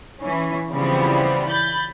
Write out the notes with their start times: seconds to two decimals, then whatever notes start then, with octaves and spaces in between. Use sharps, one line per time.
0.20 E3 C#4
0.72 C#3 E3 F3 G3 B3 C4
1.48 B5 G6 A6